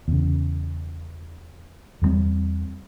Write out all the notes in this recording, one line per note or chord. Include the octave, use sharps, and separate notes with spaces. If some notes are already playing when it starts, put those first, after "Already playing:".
E2 C#3
E2 G2 G3 C4